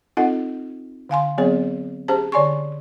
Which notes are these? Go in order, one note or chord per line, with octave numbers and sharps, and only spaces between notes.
C4 D#4 F4 A4 D#5 F#5
D3 F5 G#5 C6
F#3 B3 C4 G#4 C#5
C#4 G4 G#4 C5 A5
D3 C#5 D5 G#5 C6 C#6